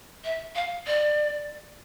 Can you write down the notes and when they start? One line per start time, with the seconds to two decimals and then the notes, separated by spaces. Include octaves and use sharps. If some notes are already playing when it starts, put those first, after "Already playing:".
0.24 E5
0.55 F5
0.87 D5